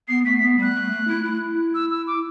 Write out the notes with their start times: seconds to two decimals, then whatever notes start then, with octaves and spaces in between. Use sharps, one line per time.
0.08 B3 C7
0.25 A3 B6
0.38 B3 B6
0.58 G3 F#6
0.75 A3
0.92 A3
1.08 E4
1.24 E4
1.74 E6
1.91 E6
2.07 D6